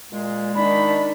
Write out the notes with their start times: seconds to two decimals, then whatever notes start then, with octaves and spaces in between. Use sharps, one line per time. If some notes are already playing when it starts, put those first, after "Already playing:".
0.12 A#2 G#3
0.55 D#3 D4 B5